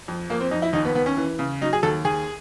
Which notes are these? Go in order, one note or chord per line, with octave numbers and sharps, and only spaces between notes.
F2
F2 A#3
C4
F2 D#4
E4
D#2 D#4
B3
D#2 B3
C#4
E3
C#3
F#3 D#4
G#4
D#2 A4
D#2 G#4